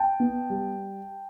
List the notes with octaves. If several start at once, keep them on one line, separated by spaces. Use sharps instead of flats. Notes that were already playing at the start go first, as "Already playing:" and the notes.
Already playing: G5 A5
B3
G3